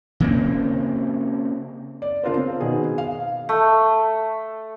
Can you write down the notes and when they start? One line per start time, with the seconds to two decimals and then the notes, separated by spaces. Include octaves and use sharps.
0.20 C#3 A#3 C4
2.02 D5
2.24 C#3 D4 F4 A#4 C5
2.37 C4
2.60 B2 D#3 B3 G#4
2.98 F5
3.49 A3